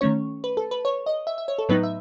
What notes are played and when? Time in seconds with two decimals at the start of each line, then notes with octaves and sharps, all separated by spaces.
0.01 D#3 A3 C#4 C#5
0.44 B4
0.57 A4
0.71 B4
0.85 C#5
1.06 D#5
1.27 E5
1.38 E5
1.48 C#5
1.59 A4
1.69 A2 F#3 B3 D#4 B4
1.83 E5